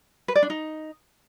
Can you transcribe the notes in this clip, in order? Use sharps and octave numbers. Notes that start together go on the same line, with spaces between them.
B4
D5
D4
D#4